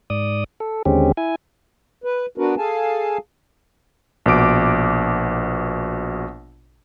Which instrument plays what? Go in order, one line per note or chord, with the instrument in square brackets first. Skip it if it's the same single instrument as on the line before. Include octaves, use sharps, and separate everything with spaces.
[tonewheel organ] G#2 D5 D#6
A4
D#2 D3 G#3 C4 C#4 G4
E4 G#5
[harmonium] B4
B3 D4 F#4 A#4 B4
G#4 A4 F5 G#5 A5
[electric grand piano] A#1 B2 D6 D7